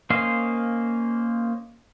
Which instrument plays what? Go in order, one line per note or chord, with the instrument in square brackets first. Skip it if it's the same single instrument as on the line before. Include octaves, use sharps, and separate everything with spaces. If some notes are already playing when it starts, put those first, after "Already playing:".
[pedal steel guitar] A#3 C#4 C5 D#5 F5